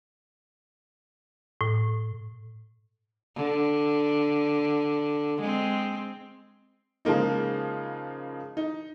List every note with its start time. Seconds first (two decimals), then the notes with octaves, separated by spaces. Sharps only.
1.61 A2
3.36 D3
5.41 G#3 C4
7.05 C#3 F3 G#3 A#3 D#4
8.57 D#4